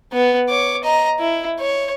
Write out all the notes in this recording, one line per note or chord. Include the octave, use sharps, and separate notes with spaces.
B3
C#5 D6
D#5 A#5
E4
C#5